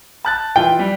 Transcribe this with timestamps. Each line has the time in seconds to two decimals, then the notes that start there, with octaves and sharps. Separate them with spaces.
0.25 A5 F#6 A6
0.56 E3 E4 F4 G5
0.79 G3